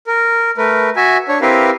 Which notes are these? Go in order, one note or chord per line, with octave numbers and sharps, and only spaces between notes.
A#4
A3 A#4 B4
F#4 E5 G#5
D4 C#5
C4 E4 G4 A#4 B4 F5